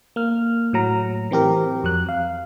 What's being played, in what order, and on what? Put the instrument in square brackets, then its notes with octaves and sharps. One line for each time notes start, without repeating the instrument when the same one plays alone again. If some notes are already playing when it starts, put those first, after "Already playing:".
[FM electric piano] A#3 F6
A2 F#3 A#5
E3 C4 G4 A#4
F2 F#3 F#6
F5